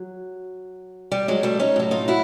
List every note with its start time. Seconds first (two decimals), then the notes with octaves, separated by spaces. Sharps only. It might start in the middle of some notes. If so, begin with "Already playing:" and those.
Already playing: F#3
1.12 G3
1.28 F#3 G#3
1.43 G3 A3
1.60 C#4 D#4
1.76 A2 F#3
1.91 D#4 F4
2.08 E4 F#4